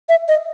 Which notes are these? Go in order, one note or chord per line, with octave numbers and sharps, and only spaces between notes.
E5
D#5